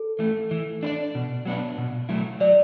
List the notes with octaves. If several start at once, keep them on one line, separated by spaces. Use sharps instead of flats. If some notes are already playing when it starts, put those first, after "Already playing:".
Already playing: A4
E3 A3
E3
D4 B4 D5
B2
F#3 B3 D4
B2
F#3 A3 E4
F#3 D5